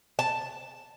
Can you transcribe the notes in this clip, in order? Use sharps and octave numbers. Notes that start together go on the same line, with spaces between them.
A5